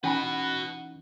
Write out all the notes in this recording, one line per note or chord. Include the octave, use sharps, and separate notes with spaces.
E3 C#4 D#4 F#4 B4 F#5 G#5 B5